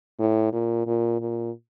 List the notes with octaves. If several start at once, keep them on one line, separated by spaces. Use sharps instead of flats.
A2
A#2
A#2
A#2